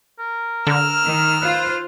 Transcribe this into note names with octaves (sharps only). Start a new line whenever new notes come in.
A#4
D3 E6 F6
D#3
F4 B4 C5